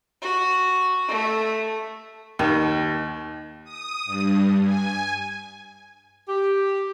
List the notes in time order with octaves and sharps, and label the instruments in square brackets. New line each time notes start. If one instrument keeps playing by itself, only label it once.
[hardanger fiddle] F#4
A3
[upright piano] D#2 [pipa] D#3
[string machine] D#6
G2
G#5
[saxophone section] G4